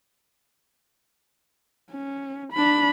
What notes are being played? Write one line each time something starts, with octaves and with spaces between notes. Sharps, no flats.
C#4
D4 B5